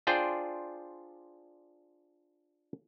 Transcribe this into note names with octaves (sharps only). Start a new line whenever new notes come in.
D4 F4 G#4 C5 D5 G5